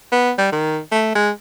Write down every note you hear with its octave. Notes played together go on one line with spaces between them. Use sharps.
B3
G3
D#3
A3
G#3